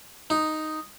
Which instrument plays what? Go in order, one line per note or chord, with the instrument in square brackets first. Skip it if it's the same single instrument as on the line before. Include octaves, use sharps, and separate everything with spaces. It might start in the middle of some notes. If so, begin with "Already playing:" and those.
[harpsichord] D#4